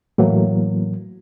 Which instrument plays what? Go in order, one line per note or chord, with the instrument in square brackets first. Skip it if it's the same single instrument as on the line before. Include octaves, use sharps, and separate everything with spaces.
[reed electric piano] A2 E3 F#3 A#3